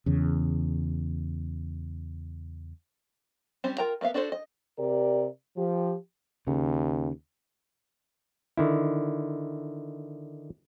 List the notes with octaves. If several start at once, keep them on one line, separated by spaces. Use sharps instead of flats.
E2 C#3
G3 C4 C#4 C5
F4 A#4 G5 A#5
A#3 B3 E5 F5
D4 F#4 A4 A#4 C5
D#5
C3 G4 A#4 D5
F3 G4
D#2 C#3
D3 D#3 E4